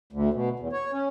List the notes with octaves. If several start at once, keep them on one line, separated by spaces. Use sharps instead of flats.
D2
B2
E2
C#5
C#4